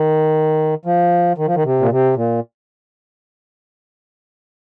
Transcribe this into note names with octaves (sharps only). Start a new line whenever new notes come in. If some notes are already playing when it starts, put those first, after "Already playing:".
Already playing: D#3
F3
D#3
F3
D#3
C3
A#2
C3
A#2